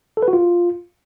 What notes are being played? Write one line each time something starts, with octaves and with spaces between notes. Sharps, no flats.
A4
B4
F#4
F4